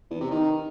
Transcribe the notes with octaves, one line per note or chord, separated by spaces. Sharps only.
E2
C3
D#3